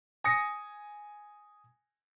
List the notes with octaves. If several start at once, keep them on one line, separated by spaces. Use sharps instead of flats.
G#5 D#6 A#6 C#7